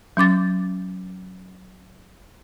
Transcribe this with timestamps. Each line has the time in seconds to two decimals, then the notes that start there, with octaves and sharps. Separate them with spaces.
0.17 F#3 C#4 D6 A6